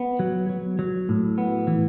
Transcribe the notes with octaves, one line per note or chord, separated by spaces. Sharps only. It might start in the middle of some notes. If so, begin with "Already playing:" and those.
Already playing: B3
F#3
F#3
F#3
A2
B3
E3